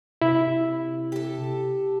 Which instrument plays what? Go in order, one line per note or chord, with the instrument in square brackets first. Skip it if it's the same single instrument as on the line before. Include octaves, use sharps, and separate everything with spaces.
[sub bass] C3 [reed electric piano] E4
[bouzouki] G4 A4